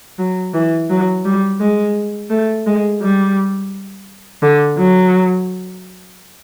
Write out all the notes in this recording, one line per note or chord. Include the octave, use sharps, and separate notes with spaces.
F#3
E3
F#3
G3
G#3
A3
G#3
G3
D3
F#3